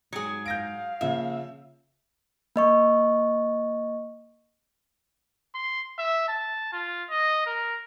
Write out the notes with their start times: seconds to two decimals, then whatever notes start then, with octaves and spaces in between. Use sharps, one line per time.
0.13 G#2 F#3 G#4
0.46 F5 G6 A#6 D7
1.01 C#3 F3 A#3 E5
2.56 A#3 D#5 C#6
5.55 C6
5.99 E5
6.28 A5
6.73 F4
7.10 D#5
7.46 A#4